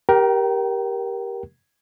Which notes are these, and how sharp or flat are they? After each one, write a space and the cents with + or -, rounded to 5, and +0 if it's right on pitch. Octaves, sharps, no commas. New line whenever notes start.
G4 +0 A#4 +15 G5 -30